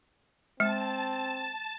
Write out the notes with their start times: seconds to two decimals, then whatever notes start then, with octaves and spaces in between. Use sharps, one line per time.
0.60 G#3 C4 A5